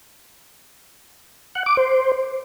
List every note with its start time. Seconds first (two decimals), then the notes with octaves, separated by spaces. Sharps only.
1.55 F#5
1.66 D6
1.77 C5